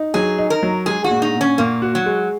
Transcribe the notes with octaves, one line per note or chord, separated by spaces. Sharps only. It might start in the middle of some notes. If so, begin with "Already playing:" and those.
Already playing: D#4
F#3 G#4
D#4
A#4
F#3
G#3 G#4
F#4
A#2
D#4
A#2
C#4
A#2 A#3
F#4
F#3
G#3